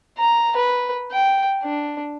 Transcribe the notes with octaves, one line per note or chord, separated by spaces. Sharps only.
A#5
B4
G5
D4